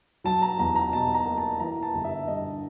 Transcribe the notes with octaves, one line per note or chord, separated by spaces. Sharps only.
F#3 A5
A#5
E2 A#5
A#5
B2 A5
A#5
A#3
A5
E3 A#5
A5
G1
E5
G2 D#5